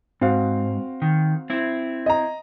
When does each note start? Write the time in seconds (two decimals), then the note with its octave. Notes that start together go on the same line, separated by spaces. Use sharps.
0.21 G#2 C4 F#4 F5
1.02 D#3
1.50 C4 E4
2.06 D#5 A#5